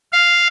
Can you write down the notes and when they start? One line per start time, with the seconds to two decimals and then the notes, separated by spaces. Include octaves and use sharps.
0.12 F5